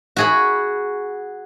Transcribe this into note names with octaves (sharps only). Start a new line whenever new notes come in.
F#4 G#4 B5